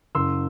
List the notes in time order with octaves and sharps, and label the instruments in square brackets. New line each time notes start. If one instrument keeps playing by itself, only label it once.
[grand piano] F#1 C6 E6